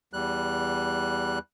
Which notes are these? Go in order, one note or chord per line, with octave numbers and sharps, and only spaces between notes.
E2 G3 F#6